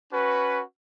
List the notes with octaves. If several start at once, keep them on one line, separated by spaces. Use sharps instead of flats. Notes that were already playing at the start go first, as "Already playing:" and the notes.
C#4 F#4 B4